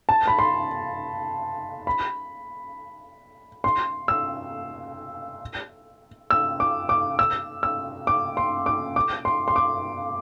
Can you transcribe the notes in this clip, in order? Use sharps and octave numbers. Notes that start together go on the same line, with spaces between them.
A5
B5
C6
B5
C6
E6
E6
D6
D6
E6
E6
D6
C6
D6
D6
C6
C6
D6